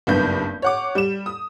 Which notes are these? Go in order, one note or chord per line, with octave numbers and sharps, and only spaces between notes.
F#1 B1 G2 B3 G6
C#5 F#5 D6
G3 E7
D#6